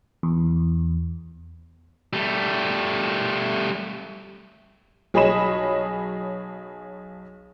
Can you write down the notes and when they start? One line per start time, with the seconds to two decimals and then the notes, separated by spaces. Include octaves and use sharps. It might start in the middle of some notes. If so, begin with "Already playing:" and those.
0.23 E2
2.13 G3 A3
5.14 B1 G#4 C#5 D#5 B5 E7